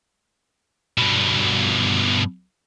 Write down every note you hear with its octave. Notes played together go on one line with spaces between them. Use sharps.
G2 B2